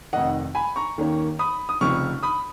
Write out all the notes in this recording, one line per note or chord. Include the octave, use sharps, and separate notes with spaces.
F1 F2 D#3 D#5 F#5
G#5 B5
A#5 C#6
D#2 D#3 A#3 C#4
B5 D#6
D#6
F1 F2 C#3 F3 C#6 F6
B5 D#6